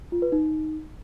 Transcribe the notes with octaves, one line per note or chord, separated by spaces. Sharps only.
F4
B4
D#4